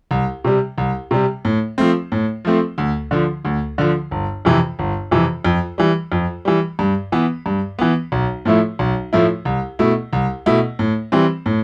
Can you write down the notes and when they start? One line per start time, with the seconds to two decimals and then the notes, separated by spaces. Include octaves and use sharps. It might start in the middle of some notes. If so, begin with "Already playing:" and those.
0.11 C2
0.44 C3 G3
0.78 C2
1.11 C3 G3
1.45 A2
1.78 F3 A3 C4
2.12 A2
2.45 F3 A3 C4
2.78 D2
3.11 D3 F3
3.45 D2
3.78 D3 F3
4.11 G1
4.45 F2 C3 E3
4.79 G1
5.11 F2 C3 E3
5.45 F2
5.78 E3 G3
6.12 F2
6.45 E3 G3
6.79 G2
7.12 E3 B3
7.46 G2
7.79 E3 B3
8.12 B1
8.45 A2 F3 A3 E4
8.79 B1
9.13 A2 F3 A3 E4
9.45 C2
9.79 B2 A3 E4
10.13 C2
10.46 B2 A3 E4
10.79 A2
11.12 E3 G3 C4
11.46 A2